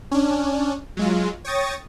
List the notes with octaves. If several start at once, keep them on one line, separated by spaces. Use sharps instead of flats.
C#4 D4
F#3 G#3 F4
C#5 G5 C#6 D#6 A6 A#6